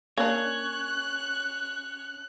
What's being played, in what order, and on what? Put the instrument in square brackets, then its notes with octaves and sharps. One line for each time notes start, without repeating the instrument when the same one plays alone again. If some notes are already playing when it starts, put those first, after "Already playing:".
[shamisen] A#3 D4 [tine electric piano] C#4 [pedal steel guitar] C#5 [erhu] F#6